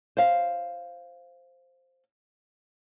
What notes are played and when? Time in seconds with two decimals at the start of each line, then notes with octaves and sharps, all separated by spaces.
0.17 C5 F5